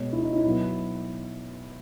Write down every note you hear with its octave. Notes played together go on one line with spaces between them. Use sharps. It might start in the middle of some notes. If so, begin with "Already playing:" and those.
Already playing: B2 G#3 B3 C#5
E4
D#4
E4
B2 F#3 B3 E4